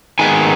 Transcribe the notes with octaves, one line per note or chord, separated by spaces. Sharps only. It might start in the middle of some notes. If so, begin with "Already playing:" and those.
D#3 G#3 B3 G#5